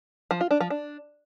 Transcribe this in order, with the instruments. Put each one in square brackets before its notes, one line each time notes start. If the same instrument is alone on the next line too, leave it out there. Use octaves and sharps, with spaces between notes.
[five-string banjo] F3
F4
D4
F3
D4